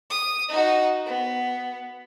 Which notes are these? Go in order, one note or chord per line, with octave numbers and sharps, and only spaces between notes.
D#6
D#4 F#4
B3